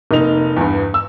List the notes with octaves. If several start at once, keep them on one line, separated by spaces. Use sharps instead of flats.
F1 A#3 D#4 F7
E2 G2
E6